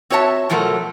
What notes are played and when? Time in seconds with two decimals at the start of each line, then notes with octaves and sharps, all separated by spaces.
0.10 C4 F#4 C#5 E5 A5
0.50 B2 F3 F#3 A3 A4 A#4